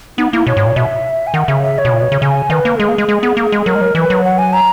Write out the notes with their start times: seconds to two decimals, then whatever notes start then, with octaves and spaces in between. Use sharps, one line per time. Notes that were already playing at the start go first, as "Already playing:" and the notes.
0.18 B3 D#4
0.32 A#3 E4
0.47 B2 C#5
0.57 G#2
0.66 A#2
0.76 B2 E5
1.27 G#5
1.34 D#3 F#5
1.48 C#3 E5
1.63 E5
1.78 C#5
1.85 B2
1.93 A#2
2.02 B2
2.12 C#3
2.22 C#3 G#5
2.50 D#3 B4
2.65 A#3
2.80 G#3 G#4
2.88 A#3
2.98 G#3
3.09 G#3
3.23 B3
3.37 A#3
3.52 G#3
3.66 F#3 A#4
3.75 G#3
3.81 F#3
3.95 E3 B4
4.10 F#3
4.24 F#5
4.38 G#5
4.53 A#5